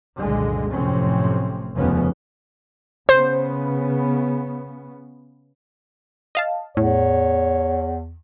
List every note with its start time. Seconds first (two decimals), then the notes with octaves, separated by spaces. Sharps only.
0.18 F#1 C2 A#2 D3 G#3
0.71 F1 F#2 A2 C3 C4 C#4
1.76 F1 D#2 C#3 F3 B3 C#4
3.09 C#3 B3 C5
6.35 D#5 F5 A5
6.77 E2 A2 C#5